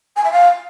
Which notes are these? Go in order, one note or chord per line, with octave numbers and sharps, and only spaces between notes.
G#5
E5
F5